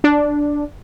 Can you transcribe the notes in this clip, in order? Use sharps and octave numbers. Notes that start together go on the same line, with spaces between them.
D4